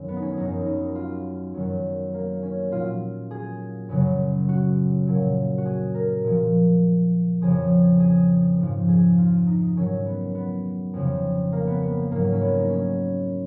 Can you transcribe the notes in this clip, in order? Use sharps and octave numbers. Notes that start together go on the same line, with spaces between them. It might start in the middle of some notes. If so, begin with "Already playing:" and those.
Already playing: F#2 D#3 F#3
B3
D#4
C#4
F#2 D#3 F#3 D#4
D#4
F4
F#2 D#3 F#3
A#3
C#4
A#2 F#3 F4
G#4
F#2 C#3 F#3
F#4
A#2 F#3
F#4
G#4
A#4
A#2 F3
F2 C#3 F3 G#4
G#4
G#2 F3
G#4
F4
D#4
G#2 D#3 F#3 C#4
B3
B3
F2 C#3 F3
A#3
B3
B3
A#3
G#2 F#3 A#3
C#4
B3
D#4
C#4